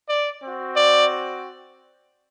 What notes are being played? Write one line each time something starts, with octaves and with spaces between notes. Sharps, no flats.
D5
C4 F#4
D5